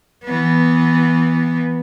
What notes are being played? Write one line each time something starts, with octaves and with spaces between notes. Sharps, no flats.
E3 B3